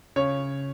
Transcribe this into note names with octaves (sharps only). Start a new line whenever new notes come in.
C#3 C#5